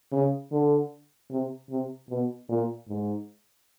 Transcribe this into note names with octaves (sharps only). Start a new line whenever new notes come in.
C#3
D3
C3
C3
B2
A#2
G#2